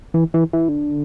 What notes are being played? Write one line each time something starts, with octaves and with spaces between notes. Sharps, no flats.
E3
E3
E3
D3